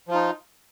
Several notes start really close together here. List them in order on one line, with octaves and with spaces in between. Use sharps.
F3 F4 D#4